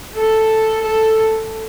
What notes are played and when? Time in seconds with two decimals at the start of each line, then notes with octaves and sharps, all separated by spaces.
0.17 A4
0.86 A4